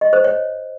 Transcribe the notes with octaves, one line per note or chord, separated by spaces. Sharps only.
D#5
C5
C#5